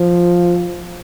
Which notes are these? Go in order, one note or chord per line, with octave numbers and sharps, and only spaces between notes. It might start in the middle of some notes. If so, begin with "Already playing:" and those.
Already playing: F3